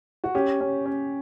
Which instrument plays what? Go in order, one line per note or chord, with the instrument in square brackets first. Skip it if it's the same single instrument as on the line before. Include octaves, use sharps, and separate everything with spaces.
[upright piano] F#4
[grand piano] C#4 [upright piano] G4
[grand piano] C#4
C#4